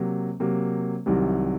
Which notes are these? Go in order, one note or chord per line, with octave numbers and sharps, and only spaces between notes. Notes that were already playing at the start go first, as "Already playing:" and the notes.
Already playing: C3 F#3 A#3
C3 F#3 A#3
C2 C3 D#3 F#3